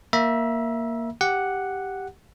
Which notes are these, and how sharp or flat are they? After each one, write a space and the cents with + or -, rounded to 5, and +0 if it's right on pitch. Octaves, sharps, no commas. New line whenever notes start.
A#3 +0 E5 +0 A#5 +45
G4 +0 F#5 +0